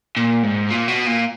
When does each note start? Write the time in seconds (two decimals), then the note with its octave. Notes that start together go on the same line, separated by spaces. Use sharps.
0.17 A#2
0.43 G#2
0.71 A#2
0.88 B2
1.07 A#2